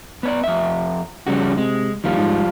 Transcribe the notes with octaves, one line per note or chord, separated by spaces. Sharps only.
B3 C#5 D5
F2 E5
F2 C#3 G3 F#4
C3 G#3
D#2 F3 G3 F4
G#2